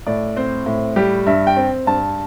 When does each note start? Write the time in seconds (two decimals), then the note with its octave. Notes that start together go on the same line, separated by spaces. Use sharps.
0.06 A2 D5
0.37 C4 C5
0.66 A2
0.96 G3 G4
1.26 G2 E5
1.47 G5
1.56 C4
1.87 G2 A5